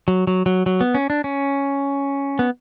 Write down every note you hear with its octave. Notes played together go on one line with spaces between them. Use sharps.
F#3
F#3
F#3
F#3
B3
C#4
D4
C#4
B3